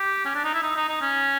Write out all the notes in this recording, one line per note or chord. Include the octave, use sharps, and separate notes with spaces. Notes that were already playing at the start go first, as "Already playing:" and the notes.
Already playing: G4
C#4
D4
D#4
E4
D#4
D#4
D#4
C#4